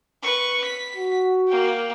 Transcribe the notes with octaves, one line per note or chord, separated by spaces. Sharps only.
B4 C#6
B6
F#4
A#3 G5